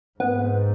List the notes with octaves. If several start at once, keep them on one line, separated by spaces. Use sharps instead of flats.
G#2 B3